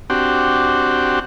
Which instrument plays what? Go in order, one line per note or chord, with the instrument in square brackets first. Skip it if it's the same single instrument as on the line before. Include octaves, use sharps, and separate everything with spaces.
[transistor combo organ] C4 D4 F#4 G4